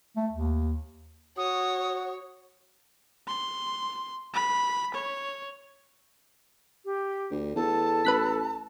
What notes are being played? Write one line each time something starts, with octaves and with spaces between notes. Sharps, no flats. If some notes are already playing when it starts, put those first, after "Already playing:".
A3
D#2
F#4 C#5 D#6
C6
B5
C#5
G4
D2
E2 A4 A5
A1 B4 F#6 B6